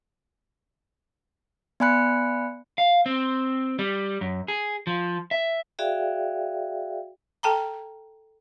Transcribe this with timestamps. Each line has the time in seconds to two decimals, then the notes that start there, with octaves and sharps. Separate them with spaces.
1.80 B3 D5 G#5 B5 F#6 C#7
2.78 F5
3.06 C4
3.79 G3
4.21 F#2
4.48 G#4
4.87 F3
5.31 E5
5.79 F#4 G#4 D5 E5 F5 G5
7.43 A4 G5 A5 A#5